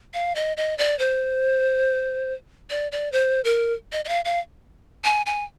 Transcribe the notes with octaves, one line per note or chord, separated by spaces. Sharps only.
F5
D#5
D#5
D5
C5
D5
D5
C5
A#4
D#5
D#5
F5
F5
G#5
G#5